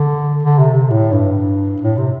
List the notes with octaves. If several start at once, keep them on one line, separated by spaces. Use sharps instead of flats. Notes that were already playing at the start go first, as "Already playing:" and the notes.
Already playing: D3
D3
C3
C3
A2
G2
A2
C3